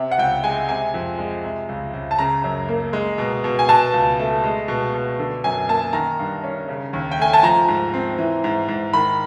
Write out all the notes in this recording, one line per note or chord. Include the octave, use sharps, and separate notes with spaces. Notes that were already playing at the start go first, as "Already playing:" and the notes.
Already playing: C3
F#5
C#2 G5
G#3 G#5
C3 G#5
F2
G#3
C3
C#2
C#2
A5
C#3 A#5
F#2
A#3
G#3
B2
B2
G#5
B2 A5
C#2
A3
G#3
B2
B2
D3
F#2 G#5
A#3 A5
D#3 A#5
G2
C#4
C#3
D#2
G5
A3 G#5
A5
F3 A#5
G#2
C4
E3
G#2
G#2
D#3 B5